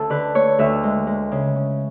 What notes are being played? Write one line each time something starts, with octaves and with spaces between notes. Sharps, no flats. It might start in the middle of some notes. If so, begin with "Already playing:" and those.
Already playing: D2 C#4 A4
D3 B4
A3 C#5
D2 E5
G#3
G#3
C#3
C#4